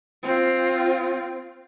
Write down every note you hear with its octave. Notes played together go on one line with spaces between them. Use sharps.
C4 F4